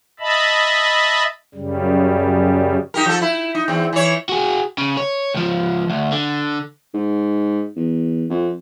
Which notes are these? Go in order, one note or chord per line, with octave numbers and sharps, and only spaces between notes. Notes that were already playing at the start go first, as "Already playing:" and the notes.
D#5 E5 A5 B5
F#2 C#3 G3
D#4 G4 A#4
F3 A4
E4
D#4
E2 C4
E3 C#5
F#4 G#4
C#3
C#5
C#2 F3
D2
D3
G#2
E2
F2